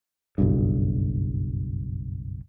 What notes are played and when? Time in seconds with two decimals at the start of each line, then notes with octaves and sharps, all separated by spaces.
0.38 F#1 B1 G2